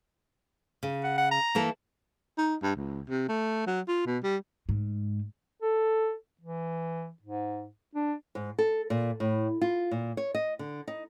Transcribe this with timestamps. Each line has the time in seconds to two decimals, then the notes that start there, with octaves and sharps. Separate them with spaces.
0.83 C#3
1.04 F#5
1.18 F#5
1.31 A#5
1.55 E3 A#3 A4
2.38 D#4
2.63 G2
2.76 C#2
3.09 C3
3.28 A3
3.67 F#3
3.88 F4
4.06 B2
4.23 G3
4.69 G#2
5.62 A4
6.41 E3
7.22 G#2
7.95 D4
8.35 G#2
8.58 A4
8.90 A#2
9.20 A2
9.61 F4
9.91 A#2
10.17 C#5
10.34 D#5
10.59 D3
10.87 D#4